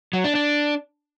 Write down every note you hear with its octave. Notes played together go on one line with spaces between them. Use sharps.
F#3
D4
D4